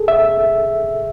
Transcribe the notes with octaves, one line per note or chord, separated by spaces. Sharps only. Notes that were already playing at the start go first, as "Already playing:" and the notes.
Already playing: G#4 A4
E5